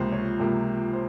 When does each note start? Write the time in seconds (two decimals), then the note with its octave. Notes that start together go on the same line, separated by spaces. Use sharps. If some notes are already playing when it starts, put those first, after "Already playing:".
Already playing: C#2 C3 F3 A#3 C5
0.12 C#5
0.39 C#2 C3 F3 A#3
0.93 C5